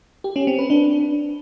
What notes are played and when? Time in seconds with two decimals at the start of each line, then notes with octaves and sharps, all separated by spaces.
0.24 G4
0.36 C#4
0.47 C4
0.59 B4
0.70 D4